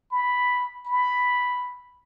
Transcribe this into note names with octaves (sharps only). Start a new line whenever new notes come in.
B5
B5